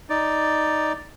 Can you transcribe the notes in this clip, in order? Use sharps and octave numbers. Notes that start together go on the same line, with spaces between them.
D#4 D5